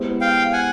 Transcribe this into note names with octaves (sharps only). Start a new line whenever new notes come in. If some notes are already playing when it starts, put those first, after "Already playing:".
Already playing: G#3 B3 E4 G4 C5
F5 G5
F#5 G#5